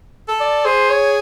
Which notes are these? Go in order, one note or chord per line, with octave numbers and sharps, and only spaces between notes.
A4
D5
G#4 C5
C#5